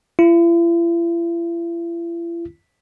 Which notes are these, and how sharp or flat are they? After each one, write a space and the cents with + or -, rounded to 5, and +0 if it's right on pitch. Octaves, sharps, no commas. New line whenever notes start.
E4 +45